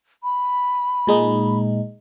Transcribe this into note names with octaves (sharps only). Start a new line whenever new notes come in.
B5
A#2 G#3 D#4